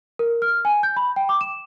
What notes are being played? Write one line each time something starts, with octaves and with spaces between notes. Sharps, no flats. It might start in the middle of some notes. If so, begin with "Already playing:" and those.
A#4
F6
G#5
G6
B5
G5
D6
E7